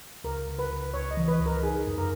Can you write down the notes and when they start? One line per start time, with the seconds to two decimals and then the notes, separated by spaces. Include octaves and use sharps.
0.24 C#2 A#4
0.47 C#2
0.59 B4
0.70 C#2
0.94 C#2 C#5
1.11 D#5
1.17 E3
1.28 B4
1.40 C#2
1.46 A#4
1.62 D#4 G#4
1.87 F#2
1.98 A#4